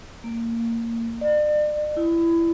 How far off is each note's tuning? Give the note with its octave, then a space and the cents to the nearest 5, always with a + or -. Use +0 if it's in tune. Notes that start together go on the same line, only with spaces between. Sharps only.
A#3 -20
D5 +35
E4 +20